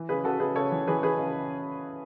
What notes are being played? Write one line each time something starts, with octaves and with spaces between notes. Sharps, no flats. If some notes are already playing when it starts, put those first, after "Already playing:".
Already playing: E3
C#3 G#4 B4
C#3 F#4 A4
C#3 G#4 B4
C#3 A4 C#5
E3
E3 G#4 B4
E3 G#4 B4
C#3